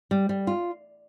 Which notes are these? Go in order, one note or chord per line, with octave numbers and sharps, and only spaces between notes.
G3
G3
F4